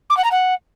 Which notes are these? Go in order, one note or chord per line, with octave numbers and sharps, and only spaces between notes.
D6
F#5
A#5
F#5